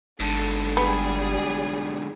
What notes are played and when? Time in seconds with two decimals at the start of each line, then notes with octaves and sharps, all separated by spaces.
0.20 G1 G#2 D3 A4
0.77 G3 B3 G#4